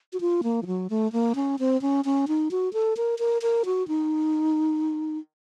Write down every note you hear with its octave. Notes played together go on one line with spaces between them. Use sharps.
F#4
F4
A#3
F3
F#3
A3
A#3
C#4
C4
C#4
C#4
D#4
F#4
A4
A#4
A#4
A#4
F#4
D#4